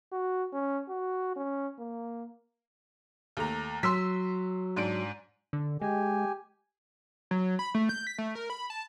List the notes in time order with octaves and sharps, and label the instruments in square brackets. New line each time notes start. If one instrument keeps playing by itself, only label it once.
[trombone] F#4
C#4
F#4
C#4
A#3
[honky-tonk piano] D#2 A3 A#5
[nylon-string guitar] F#3 [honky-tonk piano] C6 E6 B6
[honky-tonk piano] G#2 D4 D7
[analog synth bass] D3
[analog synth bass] G#3 [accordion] G4 G#5
[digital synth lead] F#3
B5
A3
G6
B6
A3
A#4
B5
A5